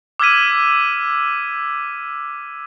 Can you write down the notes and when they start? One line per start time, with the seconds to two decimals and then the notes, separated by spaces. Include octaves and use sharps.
0.20 D6 E6 F6 G#6 B6 D#7